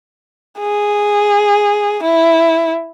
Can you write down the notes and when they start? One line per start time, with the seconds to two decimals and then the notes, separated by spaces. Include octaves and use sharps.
0.60 G#4
2.03 E4